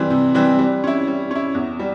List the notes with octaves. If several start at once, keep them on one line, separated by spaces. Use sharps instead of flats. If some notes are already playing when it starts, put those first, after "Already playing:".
Already playing: E3 G3 C4
C3
E3 G3 C4
G3
C#4 E4
G3
C#4 E4
E2
G3